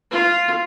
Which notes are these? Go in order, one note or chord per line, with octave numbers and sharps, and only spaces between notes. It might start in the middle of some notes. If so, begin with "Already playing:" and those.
F4